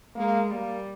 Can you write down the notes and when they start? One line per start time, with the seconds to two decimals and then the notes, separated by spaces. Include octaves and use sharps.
0.15 G#3 A#3
0.50 G3 A#3